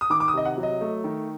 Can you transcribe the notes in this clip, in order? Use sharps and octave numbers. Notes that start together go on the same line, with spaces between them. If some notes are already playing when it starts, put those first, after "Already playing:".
D#6
D#3 D6
D6
D#6
C3 D#5
F#5
F#3
D#5
A3
D#3